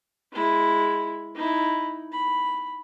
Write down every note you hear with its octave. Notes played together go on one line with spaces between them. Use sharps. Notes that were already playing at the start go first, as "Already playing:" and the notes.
G#3 E4
D#4 E4
B5